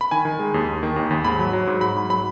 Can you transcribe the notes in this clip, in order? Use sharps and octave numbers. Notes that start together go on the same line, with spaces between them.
B5
D#3 G#5
D#3
G#3
D#2
D#2
D#3
D#2
D#2
G#2 B5
F#3
F#3
G#2
F#3 B5
G#2
F#3 B5